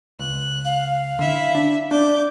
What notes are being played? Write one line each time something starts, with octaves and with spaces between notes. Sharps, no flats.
C#2 F#6
F5
D3 E4 E5
D4
D4 D5 D6 G6